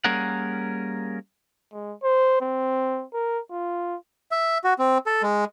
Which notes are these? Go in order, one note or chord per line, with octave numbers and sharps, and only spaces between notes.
G3 A#3 C#4 G#4 A#4 F#5
G#3
C5
C4
A#4
F4
E5
F#4
C4
A4
G#3